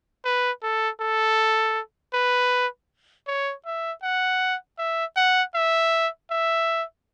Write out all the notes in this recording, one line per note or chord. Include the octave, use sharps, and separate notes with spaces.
B4
A4
A4
B4
C#5
E5
F#5
E5
F#5
E5
E5